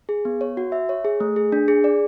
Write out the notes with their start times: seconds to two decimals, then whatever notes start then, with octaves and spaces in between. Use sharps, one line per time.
0.09 G#4
0.25 B3
0.41 C#5
0.57 F#4
0.72 E5
0.89 C#5
1.05 G#4
1.20 A3
1.36 G#4
1.52 D4
1.68 G#4
1.84 D5